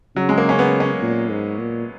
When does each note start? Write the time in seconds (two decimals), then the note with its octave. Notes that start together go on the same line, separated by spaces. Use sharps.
0.16 C#3 F#3
0.29 G#3
0.38 A#3
0.49 C#4
0.59 B3
0.80 C#4
1.02 A#2
1.31 G#2
1.59 A#2